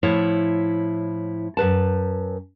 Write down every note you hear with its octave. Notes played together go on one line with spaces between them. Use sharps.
A2 F3 E4 C#5
F#2 C3 B4 A5